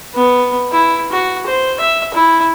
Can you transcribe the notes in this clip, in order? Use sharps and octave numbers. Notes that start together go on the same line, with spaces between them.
B3
E4
F#4
C5
E5
E4